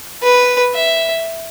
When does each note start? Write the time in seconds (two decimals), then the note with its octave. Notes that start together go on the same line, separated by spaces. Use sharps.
0.22 B4
0.75 E5